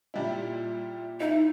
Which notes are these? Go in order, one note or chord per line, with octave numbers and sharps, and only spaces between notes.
A#2 G3 E4
D#4 E4